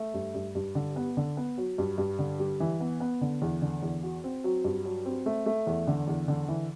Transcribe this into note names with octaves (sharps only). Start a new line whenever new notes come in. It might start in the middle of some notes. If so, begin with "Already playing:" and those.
Already playing: A3
G2
G2
G2
D3
B3
D3
B3
F#3
G2
G2
D3
G3
E3
B3
B3
D3
E2
D3
E2
F#4
C4
F#3
G2
F#3
C4
A3
A3
E2
D3
E2
D3
E3